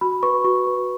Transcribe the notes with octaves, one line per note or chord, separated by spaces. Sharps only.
F#4 B5
B4 C#6
F#4 C#6
B4